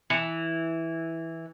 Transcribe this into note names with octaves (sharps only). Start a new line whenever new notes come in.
E3